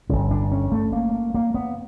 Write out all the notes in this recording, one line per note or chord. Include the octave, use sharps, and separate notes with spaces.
G1 G2 D3 C#4
D4
C#4
A3
A#3
A#3
B3